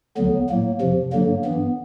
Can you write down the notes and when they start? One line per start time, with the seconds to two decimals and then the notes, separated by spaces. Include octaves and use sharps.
0.17 D2 D3 F#3 B3
0.49 A2 F#3 A#3
0.81 F2 C3 F3
1.12 G2 D3 F#3 A#3
1.44 G2 E3 B3